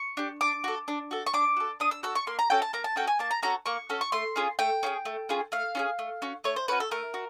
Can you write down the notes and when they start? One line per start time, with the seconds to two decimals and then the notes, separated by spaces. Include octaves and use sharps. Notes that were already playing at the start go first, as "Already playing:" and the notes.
Already playing: C#6
0.17 D4 G4
0.41 D4 D6
0.64 F#4 A4
0.88 D4
1.11 F#4 A4
1.26 C#6
1.33 D4 D6
1.57 F#4 A4
1.80 D4 D#6
1.91 E6
2.03 F#4 A4 E6
2.15 C#6
2.27 A#3 C6
2.39 A#5
2.50 C#4 F#4 A4 G5
2.62 A5
2.73 A#3 A#5
2.84 A5
2.96 C#4 F#4 A4 G5
3.07 G#5
3.19 A#3 A5
3.31 A#5
3.43 C#4 F#4 A4 A#5
3.66 A#3 C#6
3.89 C#4 F#4 A4
4.01 C#6
4.12 A3 C6
4.36 C#4 F4 G#4
4.59 A3 G5
4.83 C#4 F4 G#4
5.05 A3
5.29 C#4 F4 G#4
5.52 A3 F5
5.75 C#4 F4 G#4
5.99 A3
6.22 C#4 F#4
6.44 A3 C#5
6.56 C5
6.68 C#4 F#4 B4
6.80 A4
6.91 A3 A#4
7.14 F#4